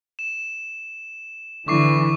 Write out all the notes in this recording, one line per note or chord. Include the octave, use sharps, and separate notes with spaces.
E7
D3 E3 C#6 D6 C7